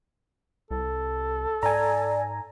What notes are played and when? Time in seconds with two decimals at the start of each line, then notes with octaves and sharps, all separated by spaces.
0.71 C2 A4
1.63 G#2 D5 G#5 A#5